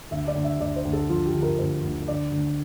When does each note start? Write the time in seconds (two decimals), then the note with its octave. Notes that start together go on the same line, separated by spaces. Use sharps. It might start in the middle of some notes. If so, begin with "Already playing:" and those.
0.11 D2 E5
0.27 D5
0.35 D2
0.44 E5
0.60 D2 D5
0.76 C5
0.85 D2
0.93 A4
1.09 F3 F4
1.26 G4
1.34 D3
1.42 A#4
1.58 D2 C5
1.83 D2
2.07 D3 D5
2.32 D2